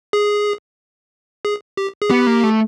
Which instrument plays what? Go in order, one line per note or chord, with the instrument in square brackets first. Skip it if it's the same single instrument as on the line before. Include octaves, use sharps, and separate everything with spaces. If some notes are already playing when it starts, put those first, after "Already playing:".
[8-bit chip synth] G#4
G#4
G4
G#4
[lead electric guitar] B3 [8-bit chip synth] G4
[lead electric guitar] A#3
A3